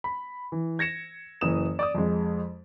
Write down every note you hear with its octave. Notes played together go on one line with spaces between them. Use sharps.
B5
E3
G#6 A#6 C#7 E7
F#1 E3 D#6 E7
D5 D6 D#6
F2 G#3